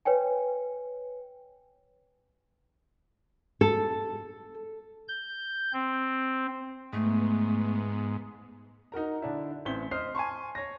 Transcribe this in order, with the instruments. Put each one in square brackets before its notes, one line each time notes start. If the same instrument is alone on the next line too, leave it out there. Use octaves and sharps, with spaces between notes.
[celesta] B4 C#5 G5 G#5
[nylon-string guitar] A4
[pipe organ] G6
C4
[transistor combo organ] G#2 [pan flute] A3 [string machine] B3
[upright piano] D#4 F#4 A#4 A#5
D3 D4 E4
A1 C4 C5 B6 G7
C5 D#5 F6 C7
G#5 A5 C6 C#6
C#5 A#6